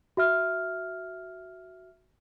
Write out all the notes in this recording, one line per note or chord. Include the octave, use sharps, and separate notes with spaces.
F#4 E5 F6